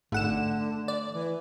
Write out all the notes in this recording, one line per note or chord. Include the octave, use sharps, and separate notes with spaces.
G#1 D3 A3 F#5 E7
D5
E3